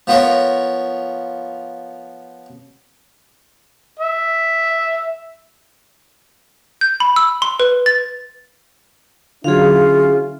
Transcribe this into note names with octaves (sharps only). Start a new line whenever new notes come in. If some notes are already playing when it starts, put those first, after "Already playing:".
F3 B3 F4 A#4 C#5
E5
G6
B5
E6
C6
B4
A6
D3 F#3 C#4 E4 F4 G#4 F5